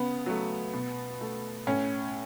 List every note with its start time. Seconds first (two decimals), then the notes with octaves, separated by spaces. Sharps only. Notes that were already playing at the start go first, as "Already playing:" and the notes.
Already playing: C#3 B3
0.26 F#3 A3
0.74 B2
1.21 A3
1.67 A2 C#4